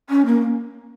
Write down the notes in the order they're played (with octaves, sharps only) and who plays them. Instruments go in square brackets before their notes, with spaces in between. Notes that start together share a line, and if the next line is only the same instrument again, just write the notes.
[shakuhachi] C#4
A#3